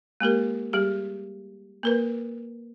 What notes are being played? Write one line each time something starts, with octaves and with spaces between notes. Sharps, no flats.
G#3 A#3 G4 A#4
G3 G4 G#4
A#3 A#4 B4